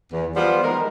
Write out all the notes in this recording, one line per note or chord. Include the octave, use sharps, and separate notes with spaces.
E2
F3 G3 B3 F4 C5
D#3 G#3 A#4